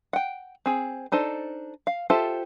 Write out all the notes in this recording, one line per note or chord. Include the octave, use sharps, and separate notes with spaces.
F#5 G5
C4 G#4
D4 D#4 A4 C5
F5
F4 G4 A4 C5 E5